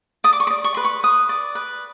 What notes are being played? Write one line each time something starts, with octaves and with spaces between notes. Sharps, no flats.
D5 D#6
D6
C#6
D6
D5
C#6
B4 C6
C#6
B4 D#6
D5
B4